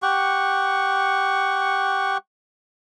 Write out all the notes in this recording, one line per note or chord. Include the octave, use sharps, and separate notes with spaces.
G4 F#5 C#6